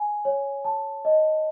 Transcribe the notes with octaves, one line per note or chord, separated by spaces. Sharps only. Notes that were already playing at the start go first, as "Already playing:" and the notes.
Already playing: G#5
C#5
A5
D#5